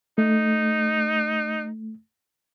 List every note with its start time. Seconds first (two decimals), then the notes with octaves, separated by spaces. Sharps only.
0.18 A3 D#4